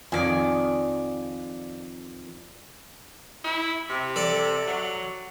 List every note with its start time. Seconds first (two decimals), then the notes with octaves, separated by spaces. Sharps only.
0.12 F2 D#3 D5 G#5
3.44 E4
3.89 C3
4.16 A4 D5 A5
4.67 F#3